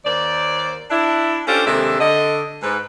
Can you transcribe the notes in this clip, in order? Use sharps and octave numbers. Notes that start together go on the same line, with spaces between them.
D#2 A#3 C5 D5
D4 E4
C#4 D4 F4 G4 A4 C5
D#2 C3 G#3 D4 A4 E5
D3 D#5
G#2 B4